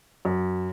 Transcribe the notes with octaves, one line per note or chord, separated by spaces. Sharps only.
F#2